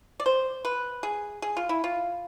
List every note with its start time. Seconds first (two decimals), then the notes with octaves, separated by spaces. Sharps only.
0.20 D5
0.26 C5
0.65 B4
1.03 G#4
1.42 G#4
1.57 F4
1.69 E4
1.84 F4